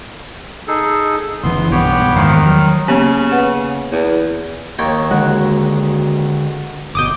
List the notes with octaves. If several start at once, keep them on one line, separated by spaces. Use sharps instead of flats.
D#4 G#4 A4
F#1 A2 E3 B3 C6
B1 G2 B3 G4 C#5 G5
E2 G#2 D#3 C5 F5 F#5
F#3 F6
C#3 A#3 B3 G4
B4 F#5
E2
D#2 C#5 G5
D3 G#3 F#4
G1 B2 D6 D#6 G6